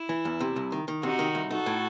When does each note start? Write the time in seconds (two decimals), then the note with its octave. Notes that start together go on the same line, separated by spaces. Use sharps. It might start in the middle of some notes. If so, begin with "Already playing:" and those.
Already playing: E4
0.09 E3
0.25 E2
0.40 C3
0.56 C2
0.72 D#3
0.88 D#3
1.03 C3 D#4 F#4
1.19 D#3
1.35 C2
1.50 D#4 F#4 A4
1.66 A2